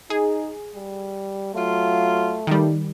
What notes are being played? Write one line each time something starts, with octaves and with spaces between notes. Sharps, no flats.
D#4 G#4
G3
F#3 A3 F4
D#3 G3